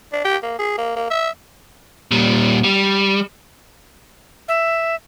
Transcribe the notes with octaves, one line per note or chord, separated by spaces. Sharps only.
D4
G4
A#3
G#4
A#3
A#3
E5
A#2 G3
G3
E5